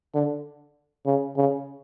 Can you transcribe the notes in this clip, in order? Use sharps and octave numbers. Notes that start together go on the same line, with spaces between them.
D3
C#3
C#3